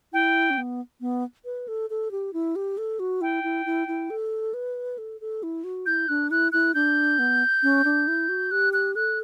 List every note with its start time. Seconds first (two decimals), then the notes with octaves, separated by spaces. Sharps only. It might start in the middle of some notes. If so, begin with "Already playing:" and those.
0.13 E4 G5
0.50 C#4
0.58 B3
1.01 B3
1.45 B4
1.68 A4
1.90 A4
2.11 G4
2.33 E4
2.56 G4
2.78 A4
3.00 F#4
3.21 E4 G5
3.44 E4
3.66 E4
3.88 E4
4.10 A4
4.54 B4
4.98 A4
5.21 A4
5.43 E4
5.64 F#4
5.86 E4 G6
6.08 D4 F#6
6.31 E4 F#6
6.52 E4 F#6
6.74 D4 G6
7.19 B3
7.63 C#4
7.84 D4
8.08 E4
8.29 F#4
8.51 G4 F#6
8.73 F#6
8.95 A4 F#6